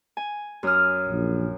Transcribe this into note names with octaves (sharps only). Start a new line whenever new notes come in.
G#5
F#2 D#6 F6
A#1